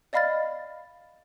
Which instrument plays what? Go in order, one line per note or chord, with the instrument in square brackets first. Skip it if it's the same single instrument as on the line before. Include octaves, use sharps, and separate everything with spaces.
[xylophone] D5 D#5 F5 B5 F6 A6